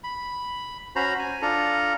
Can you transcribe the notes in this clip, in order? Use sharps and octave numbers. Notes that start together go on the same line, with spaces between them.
B5
C#4 F#4 C5 A#5 B5
G#5
D4 F4 A4 A#5